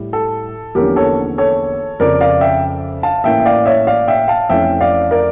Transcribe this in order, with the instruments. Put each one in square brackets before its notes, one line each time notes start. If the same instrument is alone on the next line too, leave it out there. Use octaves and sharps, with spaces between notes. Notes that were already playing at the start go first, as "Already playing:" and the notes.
Already playing: [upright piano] A2 G3
A4
E2 D3 F3 A#3 C#4 G4 A#4
A4 C#5
A4 C#5
F2 C#3 F3 A#4 D5
D5 F5
E5 G5
F5 A5
A2 E3 A#3 C#4 E5 G5
E5
D5 F5
C#5 E5
D5 F5
E5 G5
F5 A5
F2 E3 A3 C#4 E5 G5
D5 F5
A#4 D5